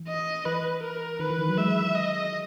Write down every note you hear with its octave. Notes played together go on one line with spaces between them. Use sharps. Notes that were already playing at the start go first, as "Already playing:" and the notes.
Already playing: E3
D#5
E3 B4
A#4
D#3 B4
E3
D#3
F#3
G#3 E5
D#5